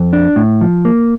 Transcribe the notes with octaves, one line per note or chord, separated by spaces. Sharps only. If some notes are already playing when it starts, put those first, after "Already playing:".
Already playing: F2
D4
A2
F3
A#3